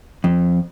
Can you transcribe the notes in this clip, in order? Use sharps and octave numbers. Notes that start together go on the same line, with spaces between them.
F2